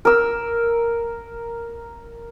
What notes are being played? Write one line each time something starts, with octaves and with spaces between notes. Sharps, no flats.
A#4 E6